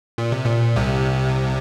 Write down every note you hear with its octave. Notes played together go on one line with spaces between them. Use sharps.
A#2
C3
A#2
C2 C3